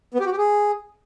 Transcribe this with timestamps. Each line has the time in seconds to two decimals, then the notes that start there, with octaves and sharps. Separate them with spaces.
0.14 B3
0.20 G4
0.26 F#4
0.32 G4
0.38 G#4